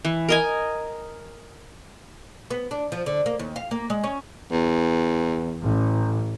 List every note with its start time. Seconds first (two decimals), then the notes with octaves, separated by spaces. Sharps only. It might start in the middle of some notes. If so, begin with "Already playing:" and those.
0.05 E3
0.29 A#4 D#5 G#5
2.50 B3
2.71 D4
2.92 F3
3.06 D3
3.26 A#3
3.39 D#2
3.56 F5
3.71 A#3
3.90 G#3
4.04 C#4
4.51 E2
5.62 A1